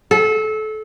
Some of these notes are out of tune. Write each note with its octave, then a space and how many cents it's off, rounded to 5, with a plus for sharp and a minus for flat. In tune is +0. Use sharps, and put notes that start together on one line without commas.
A4 -25